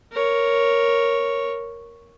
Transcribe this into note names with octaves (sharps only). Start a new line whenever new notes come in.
A#4 C#5